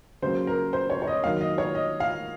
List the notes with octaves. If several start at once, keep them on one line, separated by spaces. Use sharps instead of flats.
C#3 F#3 A#3 C5
A#4
C5
C#5
C#5
D#5
D#3 F#3 A#3 F5
D#5
C#5
D#5
F5